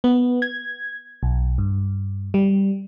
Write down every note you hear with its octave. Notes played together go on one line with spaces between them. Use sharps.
B3
G#6
B1
G2
G3